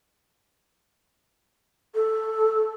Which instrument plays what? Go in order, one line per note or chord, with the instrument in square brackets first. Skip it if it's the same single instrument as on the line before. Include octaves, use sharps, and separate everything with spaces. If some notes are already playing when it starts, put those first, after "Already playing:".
[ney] A4